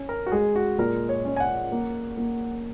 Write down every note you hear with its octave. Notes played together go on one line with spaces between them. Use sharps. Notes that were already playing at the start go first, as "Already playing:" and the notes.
Already playing: C#4
A#4
F#4
G#3 G#4
F#4
A#2 A#4
C#5
C#4
G#5
F#5
A#3
A#3